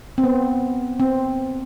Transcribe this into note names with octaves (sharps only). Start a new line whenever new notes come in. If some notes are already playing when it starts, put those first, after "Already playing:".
C4
B3
C4